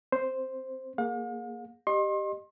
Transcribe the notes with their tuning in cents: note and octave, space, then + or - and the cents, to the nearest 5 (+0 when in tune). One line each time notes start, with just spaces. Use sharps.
C4 -10 C5 +0
A#3 +0 G#4 +0 F5 +45
G4 +0 D#5 -25 C6 +35